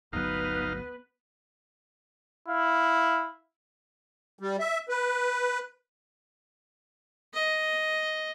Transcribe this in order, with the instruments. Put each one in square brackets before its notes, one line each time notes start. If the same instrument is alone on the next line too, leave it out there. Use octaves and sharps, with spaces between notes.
[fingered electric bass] G1 D2 F#3 [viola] B3 B4 [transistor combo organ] D#4 F5
[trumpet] E4 [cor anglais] F5
[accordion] G3
E5
B4
[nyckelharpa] D#5